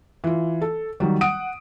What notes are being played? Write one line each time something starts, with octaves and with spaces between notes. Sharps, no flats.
E3 F4
A4
D#3 F#3 G3
F#5 D#6 D7